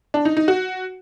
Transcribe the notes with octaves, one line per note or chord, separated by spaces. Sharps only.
D4
D#4
D#4
F#4